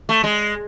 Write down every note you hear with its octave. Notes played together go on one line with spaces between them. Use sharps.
A3
G#3